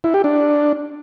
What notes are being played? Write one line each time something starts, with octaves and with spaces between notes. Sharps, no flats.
E4
G4
D4